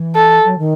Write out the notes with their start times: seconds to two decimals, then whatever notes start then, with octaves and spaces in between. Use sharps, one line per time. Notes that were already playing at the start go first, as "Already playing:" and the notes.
Already playing: E3
0.16 A4
0.44 F#3
0.58 D#3